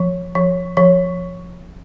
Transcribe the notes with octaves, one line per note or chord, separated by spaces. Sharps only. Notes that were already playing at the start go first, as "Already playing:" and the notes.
Already playing: F3
F3
F3